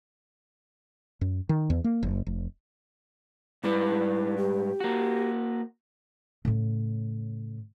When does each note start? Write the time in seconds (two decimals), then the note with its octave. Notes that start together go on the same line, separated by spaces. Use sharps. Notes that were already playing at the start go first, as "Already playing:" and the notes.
1.21 F#2
1.49 D#3
1.70 E2
1.84 A#3
2.03 F#1
2.27 F1
3.63 G#2 G3 E4 B4
4.38 G4
4.80 A#3 F#4
6.45 A2 C#3